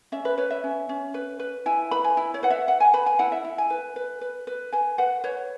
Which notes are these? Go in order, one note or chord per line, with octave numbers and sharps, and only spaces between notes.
C#4 E5
B4
B4 C#5
E5
C#4
C#4
B4
B4
E4 G#5
B4 B5
G#5
E4
C#5
B4 F#5
E5
B4 F#5
G#5
B4 B5
G#5
E4 F#5
E5
E4
G#5
B4
B4
B4
B4
B4 G#5
B4 F#5
B4 C#5